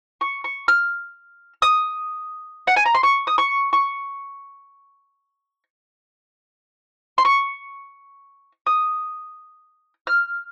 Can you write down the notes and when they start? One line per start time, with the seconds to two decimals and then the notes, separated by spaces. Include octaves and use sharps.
0.21 C#6
0.44 C#6
0.68 F6
1.62 D#6
2.67 F#5
2.76 G#5
2.86 A#5
2.95 C6
3.03 C#6
3.27 D#6
3.38 C#6
3.73 C#6
7.18 C6
7.25 C#6
8.66 D#6
10.07 F6